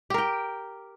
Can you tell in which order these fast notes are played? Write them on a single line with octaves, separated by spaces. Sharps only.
G4 A#4 G5